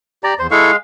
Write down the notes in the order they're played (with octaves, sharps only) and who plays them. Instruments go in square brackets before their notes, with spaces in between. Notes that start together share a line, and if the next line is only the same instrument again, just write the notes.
[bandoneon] G4 [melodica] D5 A#5
[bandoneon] E2 [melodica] C5
[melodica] G#3 F5 [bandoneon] E4 A4 C#6